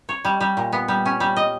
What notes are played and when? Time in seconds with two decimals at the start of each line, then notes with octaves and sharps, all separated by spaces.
0.09 C#5
0.25 G3
0.41 G3
0.57 A#2
0.73 B3
0.88 G3
1.06 C#4
1.20 G3
1.36 D#5